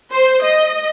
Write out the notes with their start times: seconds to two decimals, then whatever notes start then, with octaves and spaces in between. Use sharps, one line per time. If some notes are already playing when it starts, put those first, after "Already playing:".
0.11 C5
0.42 D#5